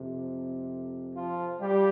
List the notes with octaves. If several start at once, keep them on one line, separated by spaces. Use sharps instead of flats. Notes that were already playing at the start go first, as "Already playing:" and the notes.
Already playing: F2 C3
F3 F4
G3 G4